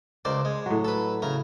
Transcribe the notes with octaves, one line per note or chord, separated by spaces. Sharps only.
C#2 A#4 C5 D5
G#3
A2 F#3
A4 B4
C#3 E4 A#4